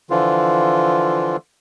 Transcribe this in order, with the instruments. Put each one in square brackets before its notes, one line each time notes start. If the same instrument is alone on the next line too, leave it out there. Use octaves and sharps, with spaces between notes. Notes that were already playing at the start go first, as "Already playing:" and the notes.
[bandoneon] D3 E3 F3 F4